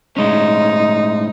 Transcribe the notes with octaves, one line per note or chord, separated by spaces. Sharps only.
A2 G#3 C#4 D#4